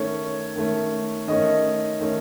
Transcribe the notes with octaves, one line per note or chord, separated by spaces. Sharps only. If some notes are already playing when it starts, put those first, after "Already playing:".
Already playing: D#3 A3 C#4 C#5
D#3 A3 C#4
D#3 A3 C#4 D#5
D#3 A3 C#4